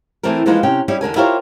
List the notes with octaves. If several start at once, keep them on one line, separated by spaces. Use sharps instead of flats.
E3 A3 C4 E4 A#4
E3 F3 G#3 A#3 B3 D#4
C3 C#4 G5
G3 C#4 D#4 E4 G4
E2 D3 A#4 G#5
E4 F4 G4 A#4 C5 C#5